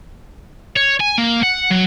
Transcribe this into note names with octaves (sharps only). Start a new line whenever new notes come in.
C#5
G#5
A#3
F#5
F#3